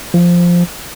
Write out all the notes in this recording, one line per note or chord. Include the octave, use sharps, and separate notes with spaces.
F3